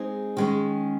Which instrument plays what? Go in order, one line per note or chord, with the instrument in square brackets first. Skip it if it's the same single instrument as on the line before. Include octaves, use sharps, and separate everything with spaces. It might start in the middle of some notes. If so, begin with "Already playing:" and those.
Already playing: [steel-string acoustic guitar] G#3 C4 D#4 G#4
D#3 G#3 C#4